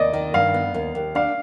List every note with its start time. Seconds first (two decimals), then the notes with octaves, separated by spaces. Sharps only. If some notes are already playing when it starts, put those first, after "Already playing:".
Already playing: D#2 D5 D#5
0.13 D#3
0.34 G2 F5
0.54 B3
0.74 D#2
0.95 D#2
1.15 D4 F5